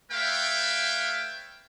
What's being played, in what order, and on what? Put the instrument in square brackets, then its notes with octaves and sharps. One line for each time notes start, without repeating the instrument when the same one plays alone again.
[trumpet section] A3 B4 C#5 E5 F5 G5